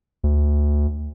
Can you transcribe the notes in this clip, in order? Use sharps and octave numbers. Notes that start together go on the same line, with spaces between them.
D2